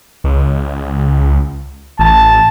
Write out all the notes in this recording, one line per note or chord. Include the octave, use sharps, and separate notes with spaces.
C#2
A1 A5